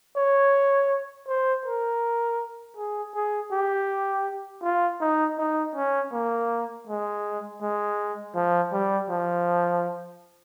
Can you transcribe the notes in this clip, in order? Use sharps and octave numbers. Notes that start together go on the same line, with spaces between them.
C#5
C5
A#4
G#4
G#4
G4
F4
D#4
D#4
C#4
A#3
G#3
G#3
F3
G3
F3